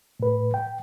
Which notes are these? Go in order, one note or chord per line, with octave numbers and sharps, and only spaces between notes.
A2 B4
G5